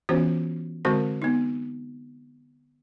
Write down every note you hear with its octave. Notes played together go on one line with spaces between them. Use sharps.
E3 B3 C#4 F4 F#4 C5
D3 G#3 C4 F#4 A#4
B3 D#4